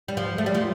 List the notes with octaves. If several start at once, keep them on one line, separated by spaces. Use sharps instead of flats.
G3
F3
A3
G3
F3